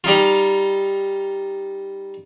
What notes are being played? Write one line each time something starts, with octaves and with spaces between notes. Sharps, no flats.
G3 D#4 F4